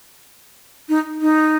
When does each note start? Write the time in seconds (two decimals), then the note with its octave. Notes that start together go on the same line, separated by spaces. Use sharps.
0.89 D#4
1.22 D#4